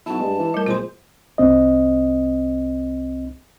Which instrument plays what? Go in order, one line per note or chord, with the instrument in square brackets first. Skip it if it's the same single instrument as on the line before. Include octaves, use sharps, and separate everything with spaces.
[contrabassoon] B1 [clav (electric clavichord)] E4 F#4 [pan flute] A5
[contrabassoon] G2 [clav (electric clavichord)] G#3
[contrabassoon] E3
[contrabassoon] A2 [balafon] G3 A#4
[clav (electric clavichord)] B1 G#3 G#4 [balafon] F4 C6 [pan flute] C5
[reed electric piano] C2 C4 D#5